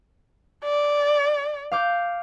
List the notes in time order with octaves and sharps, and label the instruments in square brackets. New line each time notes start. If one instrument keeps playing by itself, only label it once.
[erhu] D5
[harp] F5 D6 G6